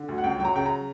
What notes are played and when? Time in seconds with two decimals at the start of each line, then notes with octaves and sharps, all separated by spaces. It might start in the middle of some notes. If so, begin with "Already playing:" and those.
Already playing: D3
0.09 D2
0.18 F#5
0.24 C#2 G5
0.39 F#3 G5
0.45 A#5
0.55 C#3 G5
0.66 A#5